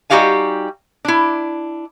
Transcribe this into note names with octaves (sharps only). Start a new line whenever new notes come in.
G3 D#4 F#4 G4 F5 G#5
D4 E4